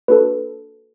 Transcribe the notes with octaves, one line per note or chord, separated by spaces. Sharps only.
A#3 D4 F#4 A4 B4